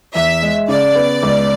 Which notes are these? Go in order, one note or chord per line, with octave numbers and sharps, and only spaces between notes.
E2 E5
G#3
C#3 D5
B3
C#2